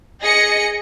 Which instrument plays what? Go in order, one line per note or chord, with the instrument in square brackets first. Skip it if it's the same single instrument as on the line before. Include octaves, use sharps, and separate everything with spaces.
[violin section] G#4 D#5 A#6 C#7